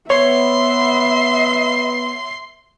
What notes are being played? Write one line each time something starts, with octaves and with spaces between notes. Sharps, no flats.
B3 C#5 E5 C6